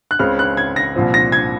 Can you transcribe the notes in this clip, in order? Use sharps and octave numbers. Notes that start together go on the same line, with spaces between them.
F#6
C#2 C#3 G#3 C4 F6
F#6
G#6
A#6
C2 A#2 F3 C4
A#6
G#6